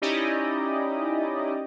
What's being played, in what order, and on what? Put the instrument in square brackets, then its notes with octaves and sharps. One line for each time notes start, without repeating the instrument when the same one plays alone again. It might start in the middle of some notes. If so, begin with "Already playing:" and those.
[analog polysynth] C#4 D#4 E4 G4 D5 D#5